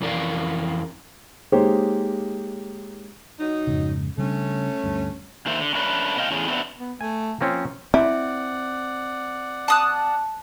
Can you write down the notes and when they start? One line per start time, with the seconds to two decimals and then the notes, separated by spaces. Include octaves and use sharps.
0.01 F2 E3 C#4 A#4 D5 F5
1.52 G#3 A#3 D#4 G4 C5 C#5
3.40 F#3 D#4
3.67 F2 G#2 C#3
4.18 C#3 G3 A3 C#4 D4
4.84 D2 G2
5.46 D#3 A#3 C5 E5
5.60 D3
5.75 A3 C#4 D4 A#4 B4
6.17 C3 D#5 F5 G5
6.31 E2 A2 C#4 G#4
6.48 B3 C4 D4 F#4 E5
6.78 B3
7.01 A3 G#5
7.41 F3 A#3 C4 C#4
7.94 C4 E4 D5 F#5
9.68 A5 D#6 F#6